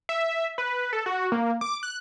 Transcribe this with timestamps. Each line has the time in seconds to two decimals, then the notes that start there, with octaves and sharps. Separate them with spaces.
0.09 E5
0.58 B4
0.93 A4
1.06 F#4
1.32 A#3
1.61 D6
1.83 F#6